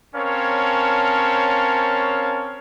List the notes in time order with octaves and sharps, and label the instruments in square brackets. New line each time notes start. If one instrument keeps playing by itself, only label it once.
[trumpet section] C4 C#4 A#4 C#5 F5 A5